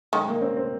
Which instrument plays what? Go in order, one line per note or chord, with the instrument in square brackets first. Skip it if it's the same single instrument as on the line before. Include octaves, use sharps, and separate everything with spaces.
[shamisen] D#3 [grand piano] G#3
[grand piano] A#3
C4
C4